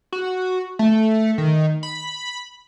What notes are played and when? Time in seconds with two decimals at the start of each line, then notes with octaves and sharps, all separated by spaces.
0.12 F#4
0.79 A3
1.38 D#3
1.83 B5